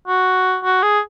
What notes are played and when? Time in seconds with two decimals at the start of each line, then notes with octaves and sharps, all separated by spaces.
0.08 F#4
0.64 F#4
0.83 G#4